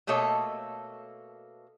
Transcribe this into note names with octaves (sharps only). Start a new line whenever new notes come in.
B2 A3 A#3 A4 C#5 D#5